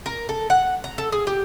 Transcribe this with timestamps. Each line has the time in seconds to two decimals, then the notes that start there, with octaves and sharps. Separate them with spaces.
0.06 A#4
0.29 A4
0.50 F#5
0.84 A#5
0.98 A4
1.12 G#4
1.27 G4